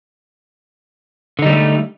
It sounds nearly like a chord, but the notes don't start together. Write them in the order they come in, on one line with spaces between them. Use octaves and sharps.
D3 D#4 G3 C4 A3